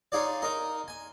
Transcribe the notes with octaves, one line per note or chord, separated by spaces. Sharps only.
D#4 F4 G#4 C#5 D5
D#4 A#4 D#5
G#5